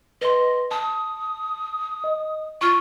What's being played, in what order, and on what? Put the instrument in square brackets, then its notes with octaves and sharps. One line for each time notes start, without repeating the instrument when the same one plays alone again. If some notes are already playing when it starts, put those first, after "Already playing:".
[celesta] B4 C6 [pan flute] D#5
[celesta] A5 [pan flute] D#6
[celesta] D#5
[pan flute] F4 [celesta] C#6 F6